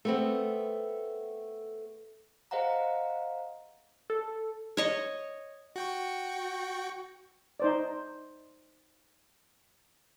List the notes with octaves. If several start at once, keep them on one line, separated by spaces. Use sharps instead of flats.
A3 B3 C4
G#4 C5 D#5 F5 F#5 A#5
A4
C#5 D#5 C#6
F#4 G5 C#6
D#4 C5 D5